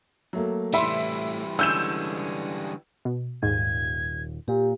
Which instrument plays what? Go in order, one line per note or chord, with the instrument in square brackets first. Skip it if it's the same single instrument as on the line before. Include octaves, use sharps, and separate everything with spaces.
[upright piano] F#3 A3 A#3
[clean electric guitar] A2 [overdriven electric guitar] E3 G3 [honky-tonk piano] E5 [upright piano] B5 C6
[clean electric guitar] D3 G#3 C#4 [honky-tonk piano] E6 G6 E7
[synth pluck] B2
[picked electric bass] D#1 D#2 [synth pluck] G#2 [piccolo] G#6
[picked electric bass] A#2 [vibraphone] G4